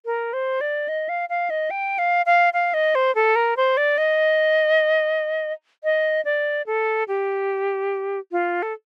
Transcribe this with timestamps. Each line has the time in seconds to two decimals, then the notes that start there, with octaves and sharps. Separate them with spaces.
0.05 A#4
0.33 C5
0.61 D5
0.88 D#5
1.09 F5
1.29 F5
1.50 D#5
1.70 G5
1.98 F5
2.26 F5
2.53 F5
2.74 D#5
2.95 C5
3.15 A4
3.36 A#4
3.57 C5
3.77 D5
3.98 D#5
5.84 D#5
6.25 D5
6.66 A4
7.08 G4
8.31 F4
8.62 A4